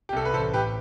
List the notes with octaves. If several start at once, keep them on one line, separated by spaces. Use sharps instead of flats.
G4
C2 A4
B4
A1 A4 C5
A2 G4 B4